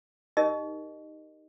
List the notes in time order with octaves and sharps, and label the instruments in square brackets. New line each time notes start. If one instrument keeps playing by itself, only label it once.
[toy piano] D#4 G4 A#4 D#5